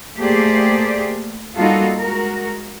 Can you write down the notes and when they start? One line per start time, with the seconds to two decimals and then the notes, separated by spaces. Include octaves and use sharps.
0.18 A3 A#3 G4 G#4 C5 D5
1.57 G3 A#3 D#4 F4 F#4 A4
1.99 G#3 F#4 A#4